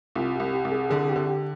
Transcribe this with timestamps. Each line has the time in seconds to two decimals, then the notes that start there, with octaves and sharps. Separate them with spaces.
0.15 C2 F4
0.35 G4
0.40 C2
0.53 G4
0.65 C2
0.72 G#4
0.90 D3 G#4
1.09 G4
1.16 D3
1.27 G4